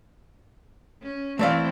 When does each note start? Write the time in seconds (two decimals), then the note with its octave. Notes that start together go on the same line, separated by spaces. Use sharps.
1.02 C#4
1.39 E3 A3 C4 E4 D5 F5